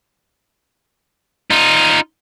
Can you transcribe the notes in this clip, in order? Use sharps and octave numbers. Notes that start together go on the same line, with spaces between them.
D#4 F4